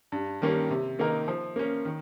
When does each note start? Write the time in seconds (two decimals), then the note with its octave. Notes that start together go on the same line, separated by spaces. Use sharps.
0.12 G2
0.42 D#3 G3 A#3 C#4
0.71 C3
0.99 D#3 A#3 D#4 A#4
1.28 F3
1.56 A#3 C#4
1.85 D#3